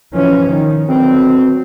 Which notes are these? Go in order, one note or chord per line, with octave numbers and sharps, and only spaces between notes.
E3 F3 C#4
D#3
D2 B2 F#3 C4